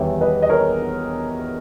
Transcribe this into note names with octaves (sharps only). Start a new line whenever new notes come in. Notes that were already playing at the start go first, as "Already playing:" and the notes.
Already playing: E2 D#3 G3 B4 C#5 E5 G5
B4 D#5
D#5
A#4 C#5